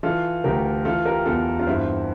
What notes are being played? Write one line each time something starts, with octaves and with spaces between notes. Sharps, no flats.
E3 F4 A4
D2 G4 A#4
E3 F4 A4
G4 A#4
E2 F4 A4
F4
G2 C4 E4